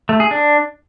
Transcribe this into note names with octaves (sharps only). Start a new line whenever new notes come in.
A3
G#4
D4